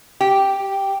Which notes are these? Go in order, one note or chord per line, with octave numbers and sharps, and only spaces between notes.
G4